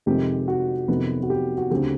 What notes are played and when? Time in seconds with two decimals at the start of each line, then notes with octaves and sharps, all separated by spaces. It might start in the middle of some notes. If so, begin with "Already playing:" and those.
0.06 F2 C3 D#3 G#3 C4 G4
0.48 F#4
0.88 F2 C3 D#3 F#3 B3
1.23 F#4
1.30 G4
1.58 F#4
1.70 D2 C#3 F#3 A3 C4 G4